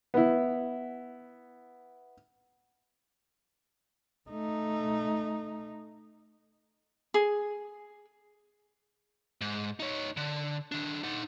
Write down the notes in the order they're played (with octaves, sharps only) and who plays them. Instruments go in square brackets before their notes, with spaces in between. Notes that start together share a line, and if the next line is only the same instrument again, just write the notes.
[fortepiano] B3 E4
[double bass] A3 D#4
[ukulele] G#4
[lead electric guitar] G#2
D#4 C#5
D3
D#3 D4
D#4 F#5